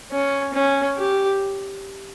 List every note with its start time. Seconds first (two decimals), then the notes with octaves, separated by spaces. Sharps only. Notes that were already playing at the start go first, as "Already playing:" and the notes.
0.12 C#4
0.54 C#4
0.97 G4